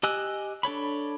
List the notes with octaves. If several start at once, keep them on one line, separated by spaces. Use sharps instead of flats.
G4 D#5 G#5 E6 F#6
D4 A4 C#5 B5